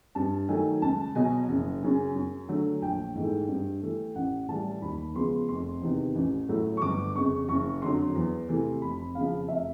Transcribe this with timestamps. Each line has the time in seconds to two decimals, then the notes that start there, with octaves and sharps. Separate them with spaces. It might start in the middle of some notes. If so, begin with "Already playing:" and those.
0.15 G2 A5
0.49 D#3 F#3 A3 G#5
0.82 C#2 A5
1.15 B2 F#3 G#5
1.49 F#1
1.82 F#2 C#3
2.15 F#2
2.49 D3 F#3 A3
2.82 A#1 G5
3.15 G#2 E3 A3
3.48 G2
3.82 E3 A3
4.15 A1 F#5
4.48 A2 E3 G3 A5
4.82 D#2 B5
5.15 C#3 F3 G#3 B3 C6
5.49 F1 C6
5.82 E2 C3 D#3
6.15 A1
6.48 A2 F#3 A3
6.77 C#6
6.82 G1 D6
7.15 F2 C#3 C#6
7.49 F#1 C#6
7.82 F2 D3 F#3 C6
8.15 E2
8.49 C3 E3 A3
8.82 F1 B5
9.15 F2 C#3 F3 F5
9.48 F1 E5